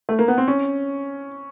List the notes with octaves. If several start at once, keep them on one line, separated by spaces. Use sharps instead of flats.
A3
A#3
B3
C4
C#4